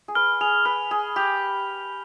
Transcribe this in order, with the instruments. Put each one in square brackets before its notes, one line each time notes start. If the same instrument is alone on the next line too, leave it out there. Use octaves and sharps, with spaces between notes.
[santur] G#4
[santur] B4 [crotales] F6
[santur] G#4 [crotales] F7
[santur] B4 [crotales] F6
[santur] G#4 [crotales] F7
[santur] G4 [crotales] F7